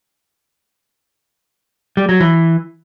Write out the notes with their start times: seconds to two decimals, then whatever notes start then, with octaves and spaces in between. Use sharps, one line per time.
1.97 G3
2.09 F#3
2.20 E3